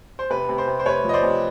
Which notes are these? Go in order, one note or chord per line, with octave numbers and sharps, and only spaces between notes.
C5
C3 B4
C3
C5
C3
C5
C3 B4 C#5
F3 D#5
C5 D5
C3